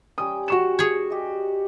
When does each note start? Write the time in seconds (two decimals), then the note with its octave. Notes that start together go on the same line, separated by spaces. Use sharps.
0.18 G3 C#4 G5 D#6
0.48 F#4 C#6 E7
0.79 G#4 C#5
1.10 G4 D#5